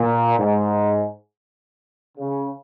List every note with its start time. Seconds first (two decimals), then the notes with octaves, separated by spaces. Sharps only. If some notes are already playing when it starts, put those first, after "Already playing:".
Already playing: A#2
0.39 G#2
2.18 C#3